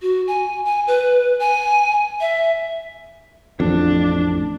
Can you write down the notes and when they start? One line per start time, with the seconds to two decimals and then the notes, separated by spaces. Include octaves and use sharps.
0.02 F#4
0.27 G#5
0.65 G#5
0.87 B4
1.39 G#5
2.21 E5
3.60 A1 F2 D4